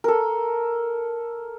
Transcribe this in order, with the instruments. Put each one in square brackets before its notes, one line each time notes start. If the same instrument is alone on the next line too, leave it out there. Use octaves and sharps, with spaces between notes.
[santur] A4 A#4